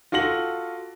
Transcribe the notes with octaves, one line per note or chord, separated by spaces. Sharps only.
F4 F#4 A4 A#6 F#7